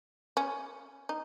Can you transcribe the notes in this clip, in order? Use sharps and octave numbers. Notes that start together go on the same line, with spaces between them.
C#4
D#4